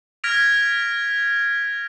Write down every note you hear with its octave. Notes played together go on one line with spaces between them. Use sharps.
F6 G#6 A#6 B6 D7 F7